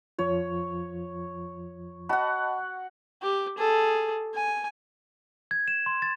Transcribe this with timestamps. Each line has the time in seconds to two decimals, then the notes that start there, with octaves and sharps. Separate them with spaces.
0.19 F2 F3 F4 C#5
2.09 F#4 D#5 F#5 A5 B5
3.22 G4
3.58 G#4 A4
4.34 G#5
5.51 G#6
5.68 E7
5.86 C6
6.02 A6